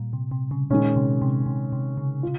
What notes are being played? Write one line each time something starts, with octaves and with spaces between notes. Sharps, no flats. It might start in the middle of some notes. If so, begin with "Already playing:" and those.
Already playing: A#2 G3
C3
C3
C#3
A#2 D#3 G#3 C#4
C3
C3
C3
C3
C#3
F4